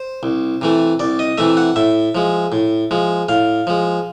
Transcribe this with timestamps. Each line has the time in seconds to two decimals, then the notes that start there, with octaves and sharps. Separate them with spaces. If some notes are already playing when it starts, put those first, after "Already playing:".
Already playing: C5
0.23 C2
0.61 C3 E3 A3
0.99 C2 D5
1.19 D#5
1.38 C3 E3 A3 E5
1.57 F#5
1.76 A2 E5
2.15 F3 G#3
2.52 A2
2.91 F3 G#3
3.29 A2 F5
3.67 F3 G#3